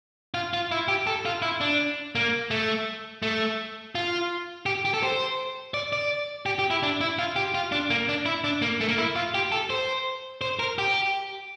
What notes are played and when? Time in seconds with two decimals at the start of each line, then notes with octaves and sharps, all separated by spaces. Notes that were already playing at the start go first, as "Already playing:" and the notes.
0.34 F4
0.54 F4
0.71 E4
0.88 G4
1.07 A4
1.25 F4
1.42 E4
1.61 D4
2.15 A#3
2.51 A3
3.22 A3
3.95 F4
4.66 G4
4.85 G4
4.94 A4
5.03 C5
5.74 D5
5.93 D5
6.46 G4
6.59 G4
6.71 E4
6.83 D4
7.01 E4
7.19 F4
7.36 G4
7.55 F4
7.72 D4
7.90 A#3
8.09 D4
8.26 E4
8.44 D4
8.62 A#3
8.81 A3
8.89 A#3
8.98 E4
9.16 F4
9.34 G4
9.52 A4
9.70 C5
10.41 C5
10.59 A#4
10.79 G4